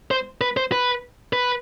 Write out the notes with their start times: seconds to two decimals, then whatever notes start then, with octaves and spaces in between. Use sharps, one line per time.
0.11 C5
0.41 B4
0.57 C5
0.72 B4
1.33 B4